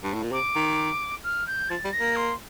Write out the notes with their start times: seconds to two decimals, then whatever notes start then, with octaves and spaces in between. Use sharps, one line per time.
0.03 G2
0.13 A2
0.23 A#2
0.31 C3 D6
0.56 D#3
1.24 F6
1.47 G6
1.69 F3 A6
1.84 G3
1.93 A#6
2.00 A#3
2.16 C6